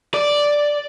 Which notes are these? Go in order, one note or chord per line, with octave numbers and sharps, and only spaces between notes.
D5